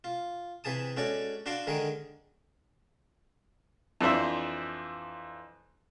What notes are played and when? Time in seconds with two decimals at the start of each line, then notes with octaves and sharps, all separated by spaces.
0.04 F4
0.64 C3 E3 G#4 A5 D#6
0.97 G#3 C#4 F#4 A4 D5
1.46 D4 F#4 F5 A5 C6 D6
1.67 D3 D#3 G#3 G#4 A#4
4.01 F2 E3 D4 C5 E5